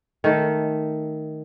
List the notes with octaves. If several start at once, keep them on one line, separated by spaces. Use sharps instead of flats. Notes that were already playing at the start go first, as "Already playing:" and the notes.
D#3 A3